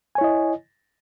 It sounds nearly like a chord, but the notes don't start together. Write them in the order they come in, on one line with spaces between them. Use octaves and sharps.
G#5 C#5 E4 D#5